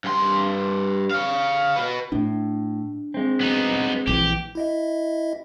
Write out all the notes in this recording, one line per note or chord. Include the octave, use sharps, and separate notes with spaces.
G2 C6
C#5 F5
F#4 B4
A2 D4
G#3 C4
B3 D#4
A#1 D3 E3 G4
E4 D#5 E5